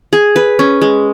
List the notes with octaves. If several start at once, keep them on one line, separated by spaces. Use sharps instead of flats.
G#4
B4
C#4
G#3